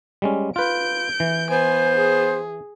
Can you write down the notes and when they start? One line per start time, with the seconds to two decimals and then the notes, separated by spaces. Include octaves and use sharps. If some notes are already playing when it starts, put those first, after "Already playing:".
0.22 G3 G#3 C#4
0.56 F4 B4 G6 D7
1.20 E3
1.51 B3 C5 G#5
1.96 G#4